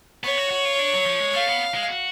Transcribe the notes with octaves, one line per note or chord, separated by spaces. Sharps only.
B3 C#5
F#4
F#4
F4
D4
F#3
F3
G#3
A3 F5
B3
G#3
F#4